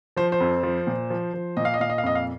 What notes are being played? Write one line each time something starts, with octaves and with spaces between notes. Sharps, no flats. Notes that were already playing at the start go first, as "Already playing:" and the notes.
F3 C5
C5
F2
F3
A#2
F3
F3
A#2 D#5
F5
D#5
A#2 F5
D#5
F5
F2 D#5
F5